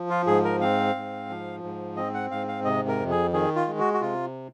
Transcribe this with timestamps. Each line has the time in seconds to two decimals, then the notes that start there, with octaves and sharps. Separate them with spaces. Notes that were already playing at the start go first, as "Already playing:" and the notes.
Already playing: F3
0.10 F4
0.27 G#2 G#4
0.44 A#4
0.61 C4 F5
0.96 G#2
1.30 F3
1.63 G#2
1.97 C4 D#5
2.14 F#5
2.31 G#2 F5
2.48 F5
2.65 C3 D#5
2.88 A#4
3.00 F2
3.11 G#4
3.33 D#3 G#4
3.56 F4
3.68 G#3
3.79 F#4
3.93 F#4
4.01 C3 F4